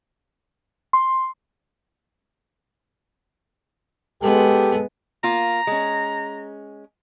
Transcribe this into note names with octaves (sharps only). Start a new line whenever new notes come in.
C6
G#3 B3 G4 A4
A#3 F4 A#5
G#3 C#4